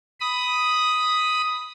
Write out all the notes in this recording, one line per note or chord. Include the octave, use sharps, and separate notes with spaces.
B5 D#6